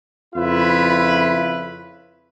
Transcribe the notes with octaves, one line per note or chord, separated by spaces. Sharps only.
F2 C#3 E4 F4 B4 E5